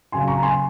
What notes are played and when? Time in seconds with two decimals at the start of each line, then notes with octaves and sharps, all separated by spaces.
0.12 C#3 F#3 G#5 C6
0.28 A#5 C#6
0.43 G#5 C6